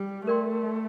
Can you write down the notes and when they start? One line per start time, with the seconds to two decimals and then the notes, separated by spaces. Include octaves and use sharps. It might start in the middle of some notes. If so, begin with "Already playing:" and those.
Already playing: G3
0.27 A3 A#4 D5 G5 C6